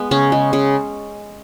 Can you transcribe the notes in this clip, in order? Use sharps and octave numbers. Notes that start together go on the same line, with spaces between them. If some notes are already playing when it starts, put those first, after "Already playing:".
Already playing: G#3 B3
C#3 C#4
G#3
C#3